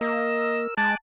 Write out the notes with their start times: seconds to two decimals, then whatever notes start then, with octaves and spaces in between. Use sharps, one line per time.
0.01 A#3 A#4 D#5 E6
0.77 G#3 G#5 A5 D6 F#6